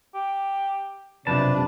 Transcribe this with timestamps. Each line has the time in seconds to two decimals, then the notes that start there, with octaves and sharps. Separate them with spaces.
0.14 G4
1.27 B1 F2 C3 D4 B4 A5